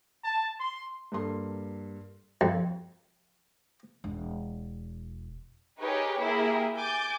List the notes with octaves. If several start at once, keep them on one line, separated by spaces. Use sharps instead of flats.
A5
C6
G2 A#3 A4 C6
F2
E1
D#4 G4 G#4 A#4 B4 C#5
A#3 E4 G4 G#4 A#4
G#5 D6 G6 A6